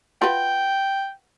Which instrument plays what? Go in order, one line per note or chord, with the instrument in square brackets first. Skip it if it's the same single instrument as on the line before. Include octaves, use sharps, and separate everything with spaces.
[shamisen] F4 F#4 B4 [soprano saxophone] G5